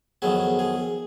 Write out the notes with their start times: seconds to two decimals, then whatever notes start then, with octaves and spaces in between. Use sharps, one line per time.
0.22 F2 D#3 F#3 B3 G#4
0.59 G#4